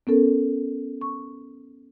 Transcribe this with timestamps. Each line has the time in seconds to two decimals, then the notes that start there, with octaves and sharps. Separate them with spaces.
0.07 B3 C#4 A4 A#4
1.01 C#6